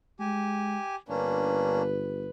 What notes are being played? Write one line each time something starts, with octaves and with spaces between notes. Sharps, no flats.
G#3 G4 G#5
G1 A#3 C#4 D4 B4